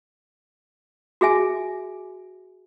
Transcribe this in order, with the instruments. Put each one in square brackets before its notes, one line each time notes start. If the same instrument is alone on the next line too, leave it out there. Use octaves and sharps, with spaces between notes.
[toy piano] F#4 G#4 E5 G#5